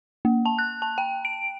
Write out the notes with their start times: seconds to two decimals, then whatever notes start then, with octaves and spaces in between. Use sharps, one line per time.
0.25 A#3
0.45 A5
0.59 F#6
0.82 A5
0.98 G5
1.25 D7